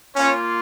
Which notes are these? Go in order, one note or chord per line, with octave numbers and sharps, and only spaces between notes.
A#3 C#4 F4 C#5